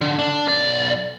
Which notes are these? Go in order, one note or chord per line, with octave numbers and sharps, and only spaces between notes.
D3
D4
B1 D5